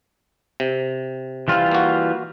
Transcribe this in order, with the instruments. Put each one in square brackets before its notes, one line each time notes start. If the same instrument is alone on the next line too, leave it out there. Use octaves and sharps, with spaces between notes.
[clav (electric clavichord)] C3
[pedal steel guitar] E3 G3 F4
[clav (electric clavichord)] A#3 F#4